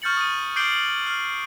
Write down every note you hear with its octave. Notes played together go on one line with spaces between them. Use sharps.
C#6 F6 G6 A6 C#7 F#7
D#6 D#7
D6 G6 C7 D7 F#7 G7
F#7
F6